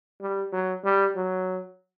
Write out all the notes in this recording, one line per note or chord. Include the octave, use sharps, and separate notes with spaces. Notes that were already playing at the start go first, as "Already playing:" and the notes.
G3
F#3
G3
F#3